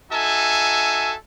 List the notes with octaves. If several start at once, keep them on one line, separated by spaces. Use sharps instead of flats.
D#4 F#4 A4 E5 G#5